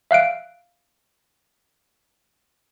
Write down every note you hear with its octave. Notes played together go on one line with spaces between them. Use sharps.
E5 F5 F#6 D7